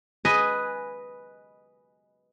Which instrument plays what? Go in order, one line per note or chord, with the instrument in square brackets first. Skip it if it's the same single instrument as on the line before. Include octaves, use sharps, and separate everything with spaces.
[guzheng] B4 D#5 G#5